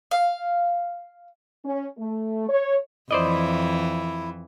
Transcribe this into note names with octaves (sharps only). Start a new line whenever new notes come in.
F5
C#4
A3
C#5
F2 E3 E4 C5 D5 D#5